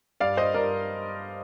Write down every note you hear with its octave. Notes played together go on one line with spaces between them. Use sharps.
G2 D5 F5
C5 D#5
G2 A#4 D5